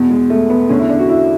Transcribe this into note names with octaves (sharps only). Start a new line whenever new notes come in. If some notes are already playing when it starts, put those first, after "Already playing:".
Already playing: E2 B2
G#3
A3
B3
E2 D3 C#4
E4
D4
F#4
E4